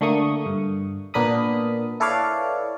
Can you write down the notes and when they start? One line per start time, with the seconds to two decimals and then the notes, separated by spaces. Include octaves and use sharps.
0.01 D3 A3 A#3 C#6 D#6
0.46 G2
1.14 A#2 B3 D4 A#4 B5 D#6
2.00 E4 A4 B4 C#5 D5 F5